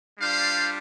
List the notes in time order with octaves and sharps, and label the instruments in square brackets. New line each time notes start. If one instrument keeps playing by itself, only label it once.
[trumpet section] G3 D4 F4 C5 F5